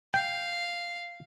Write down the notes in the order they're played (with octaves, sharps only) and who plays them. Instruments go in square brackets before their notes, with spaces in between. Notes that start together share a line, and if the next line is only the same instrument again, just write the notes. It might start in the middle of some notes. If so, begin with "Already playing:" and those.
[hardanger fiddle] F5 [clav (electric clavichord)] G5